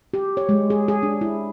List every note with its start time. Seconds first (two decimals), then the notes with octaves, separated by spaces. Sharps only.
0.14 G4
0.37 C#5
0.49 G#3
0.70 G#4
0.88 G#4
1.03 D4
1.21 E4